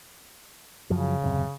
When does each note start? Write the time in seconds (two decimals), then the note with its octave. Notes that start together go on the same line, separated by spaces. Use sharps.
0.90 F#2 C#3 F3 F#3
1.22 D#1 F#2 C3